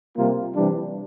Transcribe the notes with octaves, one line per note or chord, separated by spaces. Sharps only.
C3 G3 A#3 F4
C3 E3 G3 D4